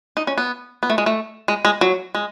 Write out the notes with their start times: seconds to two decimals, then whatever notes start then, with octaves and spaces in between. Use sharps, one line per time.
0.17 D#4
0.27 C#4
0.38 B3
0.83 B3
0.90 A3
0.98 G#3
1.06 A3
1.48 G#3
1.65 G#3
1.81 F#3
2.15 G#3